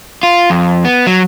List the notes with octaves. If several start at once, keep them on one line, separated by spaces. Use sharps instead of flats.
F4
F2
B3
F#3